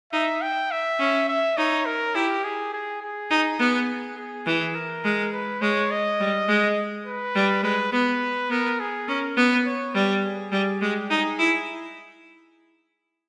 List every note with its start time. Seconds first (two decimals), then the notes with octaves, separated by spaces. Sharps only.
0.13 D#4 E5
0.42 G5
0.71 E5
0.99 C#4
1.28 E5
1.57 D#4 C#5
1.86 A#4
2.15 E4 G4
2.44 G#4
2.73 G#4
3.02 G#4
3.30 D#4
3.59 B3 G#4
4.17 G#4
4.46 E3
4.75 A#4
5.04 G#3
5.33 B4
5.61 G#3 C#5
5.91 D#5
6.20 G3
6.48 G#3
7.06 B4
7.35 G3
7.63 G#3 B4
7.92 B3 B4
8.50 B3 A#4
8.80 G#4
9.08 C#4 A#4
9.37 B3 B4
9.65 C#5
9.94 G3 B4
10.24 G#4
10.52 G3
10.81 G#3 G4
11.10 D#4 G#4
11.39 E4